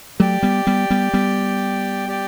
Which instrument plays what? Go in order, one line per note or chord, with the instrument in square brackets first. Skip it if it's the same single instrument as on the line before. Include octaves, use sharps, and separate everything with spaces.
[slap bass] F#3 A3 [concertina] G4 D5 G5
[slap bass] G3 B3
G3 B3
G3 B3
G3 B3
[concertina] G4 D5 G5